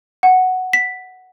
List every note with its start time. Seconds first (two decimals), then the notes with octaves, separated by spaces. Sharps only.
0.23 F#5
0.73 B6